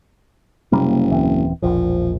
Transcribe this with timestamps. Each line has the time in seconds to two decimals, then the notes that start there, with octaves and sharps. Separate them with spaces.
0.72 F#1 C3 G3 A#3
1.09 D#1 E3 C4
1.62 E1 A#1 F3